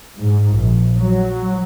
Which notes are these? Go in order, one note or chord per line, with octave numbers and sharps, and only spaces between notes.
G#2
A#1
F#3